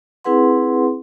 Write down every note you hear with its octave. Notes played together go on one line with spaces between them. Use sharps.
C4 E4 G#4 B4 F#5 C6